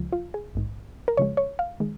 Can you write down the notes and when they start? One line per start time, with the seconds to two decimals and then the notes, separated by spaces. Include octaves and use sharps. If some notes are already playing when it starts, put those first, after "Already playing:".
Already playing: C#2 C#3 F3 G#3
0.13 F4
0.34 G#4
0.55 A#1 G#2 D#3
1.08 A#4
1.17 C#2 C#3 F3 G#3 C#5
1.37 C#5
1.59 F5
1.80 D#3 G#3